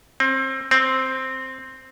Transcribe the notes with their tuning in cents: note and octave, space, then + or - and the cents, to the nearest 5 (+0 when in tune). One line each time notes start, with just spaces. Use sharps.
C4 +25
C4 +0